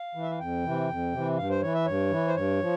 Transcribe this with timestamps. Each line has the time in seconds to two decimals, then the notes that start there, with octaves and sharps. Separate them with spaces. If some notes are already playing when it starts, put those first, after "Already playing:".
Already playing: F5
0.15 E3
0.23 E5
0.31 F5
0.40 F2 G5
0.64 C3 E3
0.89 F2
1.12 C3 E3
1.38 G2 F5
1.50 C5
1.62 E3 C#5
1.75 E5
1.86 G2 C#5
2.11 E3
2.28 C5
2.35 G2 C#5
2.61 F3